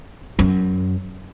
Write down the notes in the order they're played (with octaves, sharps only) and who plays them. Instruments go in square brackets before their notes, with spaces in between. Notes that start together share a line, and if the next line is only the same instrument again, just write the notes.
[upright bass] F#2